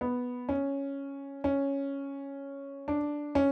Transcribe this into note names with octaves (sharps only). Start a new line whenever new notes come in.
B3
C#4
C#4
D4
C#4